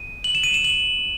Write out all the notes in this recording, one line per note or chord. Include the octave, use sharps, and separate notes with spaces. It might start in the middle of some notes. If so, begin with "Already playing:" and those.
Already playing: D#7
F#7
E7
D#7
E7
F#7